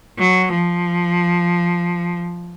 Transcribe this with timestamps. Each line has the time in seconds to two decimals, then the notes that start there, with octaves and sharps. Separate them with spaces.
0.19 F#3
0.54 F3